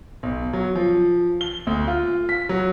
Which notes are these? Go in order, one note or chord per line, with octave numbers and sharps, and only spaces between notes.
B1
F#3
F3
G7
D2
F4
B6
F#3